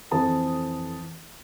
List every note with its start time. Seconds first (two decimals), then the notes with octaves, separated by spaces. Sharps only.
0.11 F2 E3 A4 C5 A5 D#6